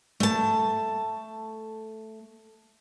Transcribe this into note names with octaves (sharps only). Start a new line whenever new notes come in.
A3 A5